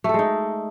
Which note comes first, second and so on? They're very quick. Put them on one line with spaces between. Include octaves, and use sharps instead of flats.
A3 A4 G#3 D#4